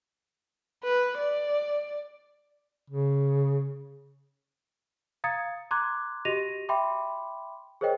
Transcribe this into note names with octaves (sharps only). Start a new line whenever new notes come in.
B4
D5
C#3
F5 A#5 D#6 G#6 A6 C#7
A#5 C6 D6 F#6 G#6
F#4 G4 D#5 A#6 D#7 F7
E5 G5 B5 C6 D6
G#4 A#4 C5 C#5 D#5 G5